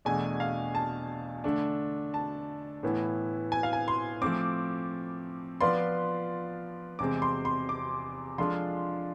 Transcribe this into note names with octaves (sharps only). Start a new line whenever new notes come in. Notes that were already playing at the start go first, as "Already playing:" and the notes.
E2 B2 A3 D4 G#4 G#5
F5
A5
D3 A3 D4
A5
A2 E3 B3 E4
G#5
F5
G#5
C6
F3 A3 C4 D6
F3 B3 F4 B4 D5 C6
E2 C3 G#3 C4 D6
C6
C6
D6
F3 G#3 D4 F4 A4 C6